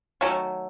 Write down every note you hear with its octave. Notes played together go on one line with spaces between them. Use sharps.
D#3 F#3 A3 C#4